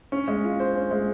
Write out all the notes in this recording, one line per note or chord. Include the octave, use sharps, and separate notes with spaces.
C#4
G#3
F4
C5
C#4
G#3